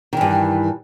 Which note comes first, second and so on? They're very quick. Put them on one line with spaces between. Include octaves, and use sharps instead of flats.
D#3 E3 G2